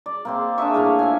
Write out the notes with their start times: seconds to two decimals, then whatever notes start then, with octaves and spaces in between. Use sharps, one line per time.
0.06 D5
0.25 A#3 C4 C6
0.58 D4 G#4 E5 C#6
0.74 A2 A#3 F5
0.99 F3 E5 G#5